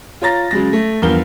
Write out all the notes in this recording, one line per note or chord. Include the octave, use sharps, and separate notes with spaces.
F4 C#5 A#5 A6 A#6
C#3 F#3 G#3 A#6
A3
E2 G2 F3 A#4 G7